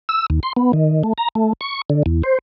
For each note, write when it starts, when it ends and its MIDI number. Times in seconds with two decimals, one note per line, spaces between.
0.09 0.26 88
0.30 0.40 39
0.43 0.53 84
0.57 0.72 59
0.73 1.03 51
1.03 1.13 57
1.18 1.28 82
1.35 1.53 57
1.61 1.81 85
1.90 2.03 50
2.06 2.22 40
2.23 2.38 72